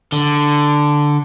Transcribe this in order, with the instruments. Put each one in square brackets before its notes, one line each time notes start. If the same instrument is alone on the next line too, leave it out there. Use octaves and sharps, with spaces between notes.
[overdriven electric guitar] D3